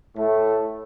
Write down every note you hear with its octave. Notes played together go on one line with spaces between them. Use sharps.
A2 A3